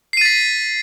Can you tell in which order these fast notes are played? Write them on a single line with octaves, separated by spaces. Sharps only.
C7 D#7 A6 B6